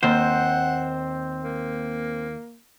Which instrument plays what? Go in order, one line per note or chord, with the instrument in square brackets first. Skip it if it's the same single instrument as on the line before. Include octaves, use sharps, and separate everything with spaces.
[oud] D#2 [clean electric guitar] C4 C5 [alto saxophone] F#5
[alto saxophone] A#3